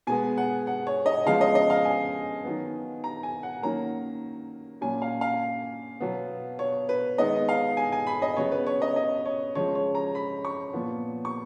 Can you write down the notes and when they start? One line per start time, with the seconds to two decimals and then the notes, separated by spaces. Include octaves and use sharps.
0.07 B2 G#3 B3 G#5
0.38 F#5
0.67 F#5
0.87 C#5
1.06 D#5
1.25 C#3 F3 G#3 B3 F5
1.41 D#5
1.55 D#5
1.70 F5
1.85 G#5
2.44 D#3 F#3 B3
3.04 A#5
3.23 G#5
3.43 F#5
3.62 D#3 F#3 A#3 C#4 A#5
4.81 A#2 F#3 C#4 G#5
5.02 F5
5.21 F5
6.00 B2 F#3 B3
6.59 C#5
6.89 B4
7.18 D#3 G#3 B3 D#5
7.49 F5
7.77 G#5
7.92 G#5
8.07 B5
8.22 D#5
8.37 C#3 F#3 B3 C#5
8.52 B4
8.67 C#5
8.82 D#5
8.96 D#5
9.25 C#5
9.55 C#3 F3 G#3 C#5
9.75 C#5
9.95 A#5
10.15 B5
10.45 C#6
10.73 A#2 F3 B3
11.25 C#6